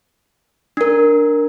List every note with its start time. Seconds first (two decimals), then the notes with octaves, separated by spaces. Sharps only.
0.77 D4 A#4